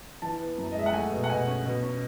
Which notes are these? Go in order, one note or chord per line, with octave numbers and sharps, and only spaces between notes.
E3 A5
B3
F#2
D#5
G#3 E5
F#5
A3 G#5
B2
F#5
B2 G#5
C#4
B2
C#4